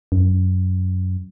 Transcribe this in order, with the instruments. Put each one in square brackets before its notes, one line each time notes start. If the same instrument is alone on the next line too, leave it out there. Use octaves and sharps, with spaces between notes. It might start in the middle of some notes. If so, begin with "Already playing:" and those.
[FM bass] F#2